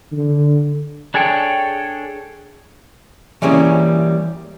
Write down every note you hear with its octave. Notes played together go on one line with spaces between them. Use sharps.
D3
D4 G#4 A4 C#5 G5
E3 G3 A#3 C#4 G#4